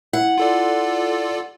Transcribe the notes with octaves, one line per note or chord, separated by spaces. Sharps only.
E4 F#5
F4 A4 D5